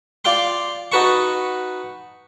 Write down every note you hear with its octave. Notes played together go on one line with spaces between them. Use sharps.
F4 D5 F5 G5 C6
D#4 F#4 B4 A5 C#6